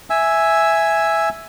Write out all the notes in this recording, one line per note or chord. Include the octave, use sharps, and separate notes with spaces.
E5 G#5 E6